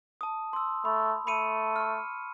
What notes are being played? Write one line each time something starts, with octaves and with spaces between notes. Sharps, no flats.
A5 D#6
C6 E6
A3 B5
A3 B5 C#7 D#7
C#6 F6